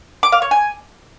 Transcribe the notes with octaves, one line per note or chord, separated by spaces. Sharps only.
D6
F5
C#5
G#5